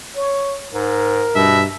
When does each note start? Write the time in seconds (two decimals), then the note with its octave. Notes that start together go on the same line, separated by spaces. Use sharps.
0.16 C#5
0.74 G#2 A#4
1.35 G2 B2 E5